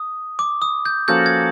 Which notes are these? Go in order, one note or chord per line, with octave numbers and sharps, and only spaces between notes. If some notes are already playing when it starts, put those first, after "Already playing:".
Already playing: D#6
D6
D#6
G6
F3 A#3 C#4 F#4 A4 G6
G#6